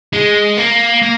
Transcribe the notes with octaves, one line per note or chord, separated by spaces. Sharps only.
G#3
A#3
A#3